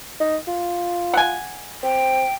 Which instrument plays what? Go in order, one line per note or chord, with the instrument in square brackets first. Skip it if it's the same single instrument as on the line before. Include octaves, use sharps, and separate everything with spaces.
[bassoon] D#4
F4
[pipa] F#5 G#5
[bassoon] C4 [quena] G5